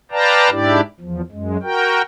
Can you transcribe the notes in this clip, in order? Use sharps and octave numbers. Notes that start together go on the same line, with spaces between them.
B4 D5 F5 G5 A5 A#5
G#2 D4 E4 G4 D5
E2 F3
F#2 G#3
F#4 A#4 G5